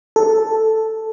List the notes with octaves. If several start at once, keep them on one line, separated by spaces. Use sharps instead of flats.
A4